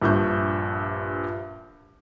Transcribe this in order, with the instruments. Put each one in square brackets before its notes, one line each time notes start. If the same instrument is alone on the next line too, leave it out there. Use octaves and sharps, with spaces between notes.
[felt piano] A#1 G2 F3 E5 C#6 G6